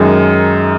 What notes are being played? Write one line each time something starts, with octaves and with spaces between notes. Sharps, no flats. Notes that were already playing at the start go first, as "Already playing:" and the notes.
Already playing: F#2 D#3 G#3 D#4